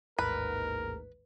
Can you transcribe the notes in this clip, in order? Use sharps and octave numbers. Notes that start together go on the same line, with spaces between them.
A1 D#2 G#2 A#4 B4